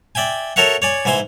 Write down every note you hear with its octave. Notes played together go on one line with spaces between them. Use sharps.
D5 E5 G5 G#5
F#4 A4 A#4 C#5 E5 F#5
C#5 D5 G#5
G#2 E3 E5 G#5 C6